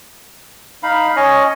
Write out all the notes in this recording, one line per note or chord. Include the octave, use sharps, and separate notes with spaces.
D#4 F5 B5
C#4 C#5 D#5